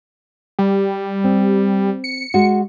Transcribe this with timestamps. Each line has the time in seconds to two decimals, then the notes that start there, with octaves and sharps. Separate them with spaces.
0.59 G3
1.24 C4
2.04 C#7
2.34 G#3 F#4